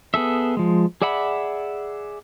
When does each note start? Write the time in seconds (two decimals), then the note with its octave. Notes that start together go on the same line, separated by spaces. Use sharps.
0.14 B3 G#4 A4 E5
0.57 F3 G#3
1.02 G#4 D5 E5 F#5 B5